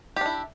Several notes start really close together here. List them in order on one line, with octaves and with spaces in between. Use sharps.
G4 D4 E4